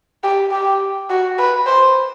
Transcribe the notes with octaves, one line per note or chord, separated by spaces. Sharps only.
G4
G4
F#4
B4
C5